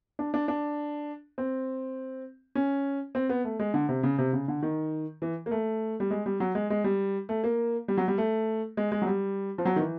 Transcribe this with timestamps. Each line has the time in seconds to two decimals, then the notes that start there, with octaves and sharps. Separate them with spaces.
0.19 D4
0.34 D4
0.48 D4
1.38 C4
2.55 C#4
3.15 C4
3.29 B3
3.45 A3
3.59 G#3
3.74 D3
3.89 C3
4.03 C#3
4.18 C3
4.33 C#3
4.48 D3
4.62 D#3
5.22 E3
5.46 A#3
5.51 A3
6.00 G3
6.11 G#3
6.26 G3
6.40 F#3
6.55 G#3
6.70 G#3
6.84 G3
7.29 A3
7.44 A#3
7.88 G3
7.98 F#3
8.08 G3
8.18 A3
8.77 G#3
8.92 G#3
9.02 F#3
9.07 G3
9.58 F3
9.65 F#3
9.76 D#3
9.81 E3